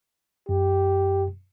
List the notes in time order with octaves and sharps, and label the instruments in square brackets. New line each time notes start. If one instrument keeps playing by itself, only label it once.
[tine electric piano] F#2 [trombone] G4